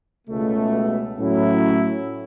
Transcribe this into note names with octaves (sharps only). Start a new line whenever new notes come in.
C#2 B2 A3
A2 F#3 C#4 E4